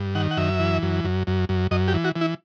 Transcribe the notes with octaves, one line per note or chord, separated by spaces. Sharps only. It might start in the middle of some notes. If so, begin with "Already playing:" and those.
Already playing: G2
D#3 F#5
F#5
F#2 E5
E3
F#2
F#2
F#2
F#2
F#2 D#5
G4
E3
F#4
E3
E4